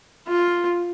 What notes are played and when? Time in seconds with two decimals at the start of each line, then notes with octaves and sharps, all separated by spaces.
0.28 F4